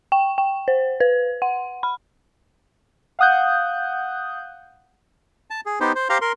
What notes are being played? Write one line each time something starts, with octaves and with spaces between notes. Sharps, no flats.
G5
G5
C5
B4
F#5
B5
F5 F#5 D#6 F#6 G6
A5
G#4
B3 D#4 G4 C5
C5
G4 C5 F5 A#5 C6
A#4 C6